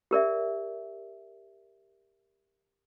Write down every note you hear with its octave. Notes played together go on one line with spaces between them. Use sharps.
G4 A#4 D5 E5